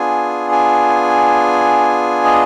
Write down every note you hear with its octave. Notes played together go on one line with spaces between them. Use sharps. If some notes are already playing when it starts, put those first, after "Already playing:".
Already playing: B3 D4 F4 G#4 G#5
G#5
D#5